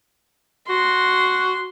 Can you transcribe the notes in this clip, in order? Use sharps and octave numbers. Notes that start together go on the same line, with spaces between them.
F#4 C6